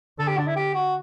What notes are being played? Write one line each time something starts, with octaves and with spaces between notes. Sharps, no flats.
D3 A4
G4
D4
E4
G4
F#4